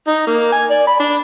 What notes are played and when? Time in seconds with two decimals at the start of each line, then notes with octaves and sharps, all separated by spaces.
0.07 D#4
0.27 A#3
0.52 G#5
0.70 D5
0.87 B5
1.00 D4